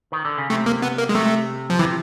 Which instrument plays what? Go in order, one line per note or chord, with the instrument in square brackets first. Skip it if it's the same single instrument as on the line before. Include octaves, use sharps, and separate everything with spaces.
[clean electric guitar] D#3
D3
C#3
[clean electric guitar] C3 [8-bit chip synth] A3
[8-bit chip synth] A#3
B3
A#3
G#3
[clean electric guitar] C3 [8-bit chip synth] A3
[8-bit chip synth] F3
[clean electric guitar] C3 [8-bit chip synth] E3